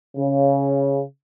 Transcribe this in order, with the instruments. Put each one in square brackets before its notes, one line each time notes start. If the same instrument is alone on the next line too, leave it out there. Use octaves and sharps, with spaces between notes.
[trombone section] C#3